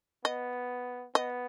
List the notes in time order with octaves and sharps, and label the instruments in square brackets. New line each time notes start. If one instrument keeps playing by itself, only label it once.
[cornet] B3 [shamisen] D#5
[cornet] B3 [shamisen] D#5